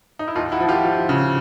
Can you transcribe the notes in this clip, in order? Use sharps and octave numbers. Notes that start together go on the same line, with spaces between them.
D#4
E4
D#2 D#4 F4
E4 F#4
F3
F4 G4
F3
C#3